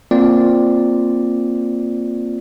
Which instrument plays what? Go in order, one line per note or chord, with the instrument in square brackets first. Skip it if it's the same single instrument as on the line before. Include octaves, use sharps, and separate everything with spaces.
[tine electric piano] A#3 C4 F4 D5